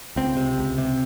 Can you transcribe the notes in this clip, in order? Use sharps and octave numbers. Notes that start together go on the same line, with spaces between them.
C#2 C4
C3
C#2
C3